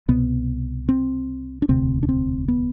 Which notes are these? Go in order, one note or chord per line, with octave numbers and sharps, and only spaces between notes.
C2 B2 B3
C4
D4
E1 D2 C3 C4
D4
C4
B3